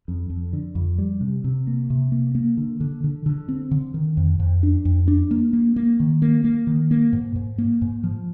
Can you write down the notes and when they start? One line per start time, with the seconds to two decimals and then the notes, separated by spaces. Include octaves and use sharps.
0.08 F2
0.30 F2
0.53 D3
0.75 F2
0.98 G3
1.21 C3
1.44 C3
1.67 A#3
1.90 C3
2.12 A#3
2.35 A#3
2.57 D3
2.80 D3
3.04 D3
3.26 D3
3.48 C4
3.71 D3
3.94 D#3
4.17 F2
4.40 F2
4.63 D4
4.85 F2
5.08 D4
5.31 A#3
5.53 A#3
5.76 A#3
6.00 D#3
6.22 A#3
6.44 A#3
6.67 D#3
6.91 A#3
7.13 G#2
7.36 G#2
7.58 A#3
7.82 G#2
8.04 F3